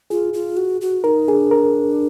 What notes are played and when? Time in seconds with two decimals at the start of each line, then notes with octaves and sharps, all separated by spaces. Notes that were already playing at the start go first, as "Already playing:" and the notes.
0.10 F4 G#4
0.34 F4
0.57 F#4
0.81 F#4
1.04 D#4 A#4
1.28 D4 G#4
1.51 A#4